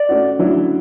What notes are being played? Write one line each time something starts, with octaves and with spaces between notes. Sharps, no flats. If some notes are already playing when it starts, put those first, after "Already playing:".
Already playing: D5
A3 C#4 F#4
D3 F#3 C#4 E4